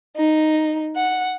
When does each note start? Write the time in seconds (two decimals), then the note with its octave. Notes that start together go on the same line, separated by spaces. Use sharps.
0.17 D#4
0.96 F#5